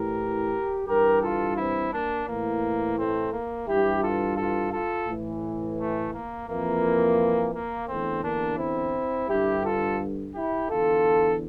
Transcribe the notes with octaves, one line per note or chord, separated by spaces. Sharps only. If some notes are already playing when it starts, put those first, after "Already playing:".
Already playing: A2 E3 G4 A#4
G2 E3 G4 A#4
F4 A4
C4 E4
A#3 D4
A2 E3 A#3
A3 C4
A#3
G2 E3 E4 G4
F4 A4
F4 A4
F4 A4
A2 E3
A3
A#3
F2 E3 A#3
A#3
E2 D3 A3 C4
A#3 D4
C4 E4
G2 D3 E4 G4
F4 A4
E4 G4
E2 D3 F4 A4